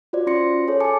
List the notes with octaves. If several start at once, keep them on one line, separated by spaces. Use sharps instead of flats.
F4 F#4 C5 D5
C#4 F4 C6 A#6 C#7
G#4 A4 C#5
G#5 A5 D6 C#7